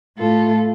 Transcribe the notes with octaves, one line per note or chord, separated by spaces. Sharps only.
A2 A3 F4 A4